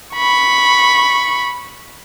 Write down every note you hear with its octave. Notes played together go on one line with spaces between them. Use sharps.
B5 C#6